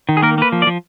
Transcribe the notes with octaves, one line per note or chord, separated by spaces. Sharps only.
D#3
G#4
A#3 A#4
A#3 B4
F3
D5
F3